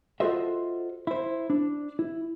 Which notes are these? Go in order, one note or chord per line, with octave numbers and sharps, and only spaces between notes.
F4 F#4 A4 C5 D#5 E5
E4 C5
D4
E4